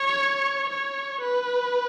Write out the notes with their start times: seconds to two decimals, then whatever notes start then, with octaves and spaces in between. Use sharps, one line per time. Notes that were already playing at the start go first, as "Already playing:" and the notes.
Already playing: C#5
0.70 C#5
1.21 B4